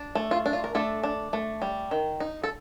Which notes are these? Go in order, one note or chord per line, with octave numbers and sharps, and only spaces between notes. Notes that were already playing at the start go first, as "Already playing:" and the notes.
Already playing: D4
A3
F4
D4
F4
A#4
A3 D4 A4
D4
A3
G3
D#3
D#4
A4